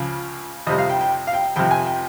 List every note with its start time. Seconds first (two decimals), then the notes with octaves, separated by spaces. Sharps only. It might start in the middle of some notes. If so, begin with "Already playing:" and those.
Already playing: C#2 C#3 F3
0.67 F2 C3 G3 D#5
0.78 F5
0.89 G5
1.01 G5
1.27 F5
1.33 G5
1.56 F2 C3 F3 G5
1.71 G#5
1.86 G5